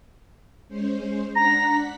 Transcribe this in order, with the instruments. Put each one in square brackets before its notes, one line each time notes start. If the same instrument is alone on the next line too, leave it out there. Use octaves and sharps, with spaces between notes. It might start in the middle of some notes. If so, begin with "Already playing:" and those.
[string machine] G#3 C#4 C5
[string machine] D4 F#5 B6 [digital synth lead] A#5 [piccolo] A#6